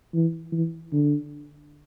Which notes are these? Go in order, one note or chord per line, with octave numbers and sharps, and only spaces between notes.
E3
E3
D3